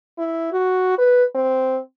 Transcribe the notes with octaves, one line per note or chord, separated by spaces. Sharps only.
E4
F#4
B4
C4